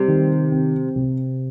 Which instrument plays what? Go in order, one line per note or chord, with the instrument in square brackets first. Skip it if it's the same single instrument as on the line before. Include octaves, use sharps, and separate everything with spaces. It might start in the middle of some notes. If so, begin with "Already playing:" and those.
Already playing: [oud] C3 [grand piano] G3
[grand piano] D#3
C4
C3